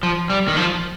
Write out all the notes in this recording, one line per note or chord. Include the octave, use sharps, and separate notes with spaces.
F3
G3
D#3
F3